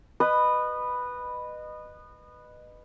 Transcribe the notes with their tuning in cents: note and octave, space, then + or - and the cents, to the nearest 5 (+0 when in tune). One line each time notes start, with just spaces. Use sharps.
B4 +0 D#5 -25